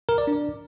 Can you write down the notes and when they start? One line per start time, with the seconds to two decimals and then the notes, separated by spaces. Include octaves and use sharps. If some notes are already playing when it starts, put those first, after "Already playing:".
0.09 A#4
0.18 D5
0.27 D4